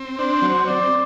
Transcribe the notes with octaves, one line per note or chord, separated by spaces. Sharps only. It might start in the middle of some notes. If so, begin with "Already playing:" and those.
Already playing: C4
D4 C5
F#3
C4 D5